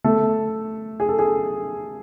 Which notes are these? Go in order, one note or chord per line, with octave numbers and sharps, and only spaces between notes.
A3 A4
G#4
A4
G#4